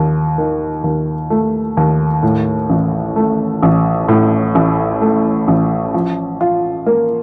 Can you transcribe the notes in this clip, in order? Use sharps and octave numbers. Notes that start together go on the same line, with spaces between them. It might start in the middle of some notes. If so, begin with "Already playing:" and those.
Already playing: D#2
D#3
D#2
A3
D#2
A2
A1
A3
A1
A2
A1
A3
A1
F3
F4
A#3